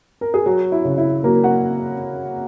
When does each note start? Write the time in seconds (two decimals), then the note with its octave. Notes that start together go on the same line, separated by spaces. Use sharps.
0.21 A#4
0.34 G#4
0.46 F#3 F#4
0.72 E4
0.85 C#3
0.98 E4
1.23 F#3 A#3 A#4
1.43 F#4 F#5